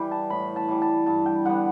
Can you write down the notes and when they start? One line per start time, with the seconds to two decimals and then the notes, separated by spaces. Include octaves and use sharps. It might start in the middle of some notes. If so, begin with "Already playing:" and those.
Already playing: E3 G3 G5
0.11 A5
0.30 A2 B5
0.56 A5
0.68 E3 G3
0.82 A5
1.06 G2 A5
1.26 G5
1.45 D3 G3 B3 F#5